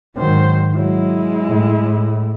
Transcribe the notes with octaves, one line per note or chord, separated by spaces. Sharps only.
G#2 D#3 F#3 C5
F#3 G#3 E4
A2
A2